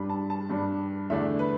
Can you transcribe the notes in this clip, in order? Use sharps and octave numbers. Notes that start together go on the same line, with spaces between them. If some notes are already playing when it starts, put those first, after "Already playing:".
Already playing: G2 G3 D4 B5
A5
A5
G2 G3 D4
E2 D3 A3 D4 E5
B4